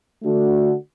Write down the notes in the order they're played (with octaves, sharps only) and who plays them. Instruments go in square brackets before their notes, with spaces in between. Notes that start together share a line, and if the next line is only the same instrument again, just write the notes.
[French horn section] D3 A3 D4 F#4